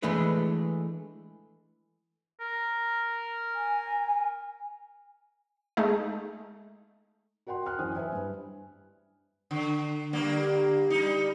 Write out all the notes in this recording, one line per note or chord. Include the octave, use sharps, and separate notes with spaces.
E3 G#3 A3 D4 B4
A#4
G#5
G#3 A3 D#4
F#4 A#4 F#5 G5 C6
G5 F6 F#6
F#2 E3 C5 G#5 D#6
B4 C5 E5 G#5
G2
D3
D3 G3 A#3
G3 D#4